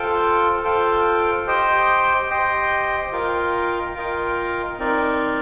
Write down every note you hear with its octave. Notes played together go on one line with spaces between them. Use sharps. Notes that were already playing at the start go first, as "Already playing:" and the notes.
Already playing: F4 A4 C5 G5
F4 A4 C5 G5
G4 C5 D#5 G5
G4 C5 D#5 G5
F4 A#4 D#5 G5
F4 A#4 D#5 G5
C4 D#4 A#4 D5